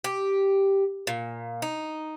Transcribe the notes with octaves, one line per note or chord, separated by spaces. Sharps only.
G4
A#2
D#4